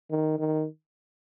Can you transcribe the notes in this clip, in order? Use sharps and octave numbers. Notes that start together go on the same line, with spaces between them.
D#3
D#3